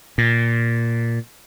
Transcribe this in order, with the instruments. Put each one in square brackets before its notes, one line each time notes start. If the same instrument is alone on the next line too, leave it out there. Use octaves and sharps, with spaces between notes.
[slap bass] A#2